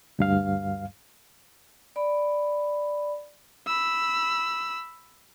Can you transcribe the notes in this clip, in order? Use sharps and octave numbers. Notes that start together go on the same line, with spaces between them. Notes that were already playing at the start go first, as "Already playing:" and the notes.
D2 G2 F5
D5 B5
B5 E6